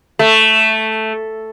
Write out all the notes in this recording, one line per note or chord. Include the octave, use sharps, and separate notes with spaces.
A3